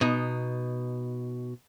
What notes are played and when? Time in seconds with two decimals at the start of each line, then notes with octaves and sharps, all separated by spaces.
0.01 B2 D#4